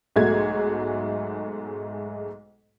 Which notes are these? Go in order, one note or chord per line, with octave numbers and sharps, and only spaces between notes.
B1 G#2 G#3 A3 F#4 G#6